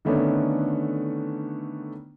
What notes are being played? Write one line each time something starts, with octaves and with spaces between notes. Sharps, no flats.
D3 D#3 A3 B3 C#4 D4